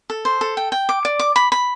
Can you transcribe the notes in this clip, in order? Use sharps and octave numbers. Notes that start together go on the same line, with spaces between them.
A4
C5
A4
G5
G5
D6
D5
D6
B5
B5